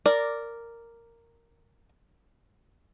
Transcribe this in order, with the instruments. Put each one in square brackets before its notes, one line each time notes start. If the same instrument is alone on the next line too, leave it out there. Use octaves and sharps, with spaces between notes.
[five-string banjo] A#4 D5